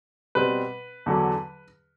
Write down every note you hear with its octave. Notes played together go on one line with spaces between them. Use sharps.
B2 G3 C4 B4
E2 D3 F#3